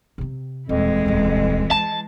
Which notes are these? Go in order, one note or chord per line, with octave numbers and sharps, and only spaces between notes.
C3 C4
D#1 F2 E3 G#3
D#1 C#2
C4 A5